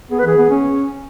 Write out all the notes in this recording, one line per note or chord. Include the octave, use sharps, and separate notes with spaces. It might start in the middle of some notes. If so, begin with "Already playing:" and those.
B3 G#4
B4
E3 G#4
B3
C#4